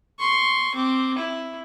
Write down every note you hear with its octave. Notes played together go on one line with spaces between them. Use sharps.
C6 C#6
C4 D6
E4